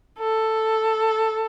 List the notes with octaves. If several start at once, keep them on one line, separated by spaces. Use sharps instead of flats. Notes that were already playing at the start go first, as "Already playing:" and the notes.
A4